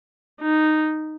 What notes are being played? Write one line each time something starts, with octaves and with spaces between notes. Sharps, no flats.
D#4